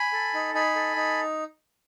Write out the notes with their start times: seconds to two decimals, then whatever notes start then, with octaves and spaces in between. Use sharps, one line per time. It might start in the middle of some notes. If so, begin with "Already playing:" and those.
Already playing: G#5 B5
0.13 A4
0.34 D#4
0.54 D#4 G#5 B5
0.75 A4
0.96 D#4